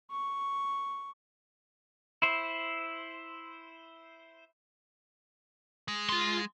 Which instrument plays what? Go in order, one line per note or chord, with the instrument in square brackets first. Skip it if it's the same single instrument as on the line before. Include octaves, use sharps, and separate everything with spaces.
[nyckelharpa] C#6
[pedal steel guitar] E4 C5
[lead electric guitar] G#3
[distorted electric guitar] F4 C6